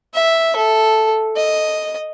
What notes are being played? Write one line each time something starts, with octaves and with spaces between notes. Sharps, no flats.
E5
A4
D#5